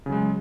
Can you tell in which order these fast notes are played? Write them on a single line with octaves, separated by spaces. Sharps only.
C#3 F#3 G#3